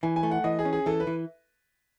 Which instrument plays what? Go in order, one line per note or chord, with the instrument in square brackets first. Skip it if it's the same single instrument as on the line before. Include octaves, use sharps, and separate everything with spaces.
[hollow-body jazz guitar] E3 [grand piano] G#5
[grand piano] G#5
[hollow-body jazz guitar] A3
[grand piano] F#5
[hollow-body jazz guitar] E3 [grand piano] D#5
[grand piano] G#4
[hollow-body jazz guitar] C#4
[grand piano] G#4
[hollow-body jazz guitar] E3 [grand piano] A4
[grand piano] B4
[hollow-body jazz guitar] E3